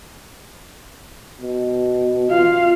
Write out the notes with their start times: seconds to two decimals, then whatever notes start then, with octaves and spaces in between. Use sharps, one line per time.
1.41 B2
2.29 F4 F5